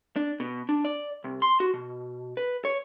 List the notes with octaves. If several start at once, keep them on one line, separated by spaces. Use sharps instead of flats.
D4
B2
D4
D5
C2
C6
F#4
B2
B4
C#5